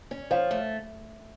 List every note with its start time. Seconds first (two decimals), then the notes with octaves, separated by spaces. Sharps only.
0.11 C#4
0.31 F3 C#5 F5
0.51 A3